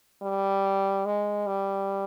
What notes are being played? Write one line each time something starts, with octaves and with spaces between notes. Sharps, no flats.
G3
G#3
G3